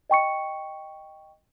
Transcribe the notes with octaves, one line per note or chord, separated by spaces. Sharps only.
D#5 G5 C#6 C#7